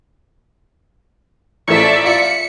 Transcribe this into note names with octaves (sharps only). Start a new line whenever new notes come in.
A1 F3 A4 D5 E5 C#6
F4 D5 E5 C#7